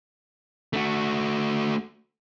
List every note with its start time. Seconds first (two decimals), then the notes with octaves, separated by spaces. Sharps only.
0.73 A3 F#4